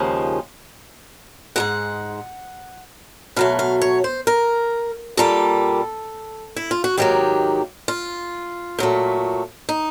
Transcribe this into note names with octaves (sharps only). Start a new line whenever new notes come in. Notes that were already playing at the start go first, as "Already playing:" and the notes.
Already playing: D#2 C#3 F3 G#3
G#2 D#3 G#3 F#5
B2 F#3 A3 F5
F5
C#5
C5
A#4
A#2 G3 A#3 A4
E4
F4
F#4
G#2 D#3 F#3 A#3 G4
F4
A#2 F#3 A3
D#4